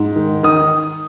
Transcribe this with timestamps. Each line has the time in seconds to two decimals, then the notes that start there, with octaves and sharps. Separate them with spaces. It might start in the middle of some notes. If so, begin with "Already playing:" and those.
Already playing: G#2
0.16 D#3
0.43 D#3 D#6